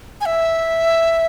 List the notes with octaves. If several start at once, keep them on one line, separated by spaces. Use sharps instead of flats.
G#5
E5